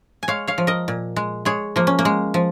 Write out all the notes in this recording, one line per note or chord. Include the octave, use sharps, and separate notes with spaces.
G#5
G#3 C#5 F5
C#5 F5
F3
A#4 D#5
A#2
G#3
G#3 G#4 C#5
F3 A#3
C#4
A#3
G#3
F3